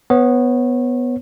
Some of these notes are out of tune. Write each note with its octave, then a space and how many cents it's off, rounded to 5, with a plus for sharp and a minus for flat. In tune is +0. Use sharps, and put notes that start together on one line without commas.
B3 +0 C#5 -25